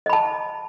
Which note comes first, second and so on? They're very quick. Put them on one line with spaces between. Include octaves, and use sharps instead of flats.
D#5 B5 A5